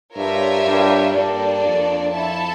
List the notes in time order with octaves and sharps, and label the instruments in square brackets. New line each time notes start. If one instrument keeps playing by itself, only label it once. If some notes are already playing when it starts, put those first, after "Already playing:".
[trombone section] G2 [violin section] F4 A#4 C#5 E5
[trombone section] G2
[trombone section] G2 [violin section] A#3 D4 A4 D5
[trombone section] F2
[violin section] E4 A4 E5 A5